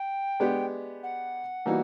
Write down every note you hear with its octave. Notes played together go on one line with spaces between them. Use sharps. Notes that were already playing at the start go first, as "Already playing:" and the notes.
Already playing: G5
G#3 B3 D4 G4
F#5
E3 G3 A#3 D#4 F#4